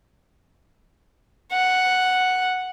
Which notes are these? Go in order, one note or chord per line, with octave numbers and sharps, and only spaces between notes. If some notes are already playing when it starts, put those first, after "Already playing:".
F#5